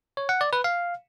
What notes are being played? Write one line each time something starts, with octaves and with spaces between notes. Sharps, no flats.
C#5
F#5
D5
B4
F5